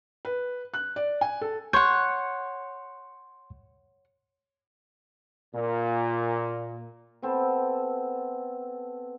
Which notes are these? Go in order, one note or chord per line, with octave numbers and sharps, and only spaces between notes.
B4
F#6
D5
G#5
A4
C#5 F#5 C6 G6
A#2
B3 C4 A4